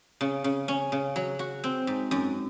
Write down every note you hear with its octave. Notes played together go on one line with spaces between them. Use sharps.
C#3
C#3
C#4
C#3
F#3
F#4
C4
G#2
F#2